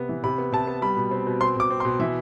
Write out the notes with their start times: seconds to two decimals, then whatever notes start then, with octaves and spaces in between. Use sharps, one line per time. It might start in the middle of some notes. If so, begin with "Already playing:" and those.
Already playing: C3 B3
0.09 E3
0.24 C3 B5
0.38 B3
0.52 C3 A5
0.67 B3
0.82 G3 B5
0.97 B2
1.11 C4
1.27 B2
1.41 C4 C6
1.56 B2 D6
1.71 C4
1.80 C6
1.85 B2
2.00 E3 E5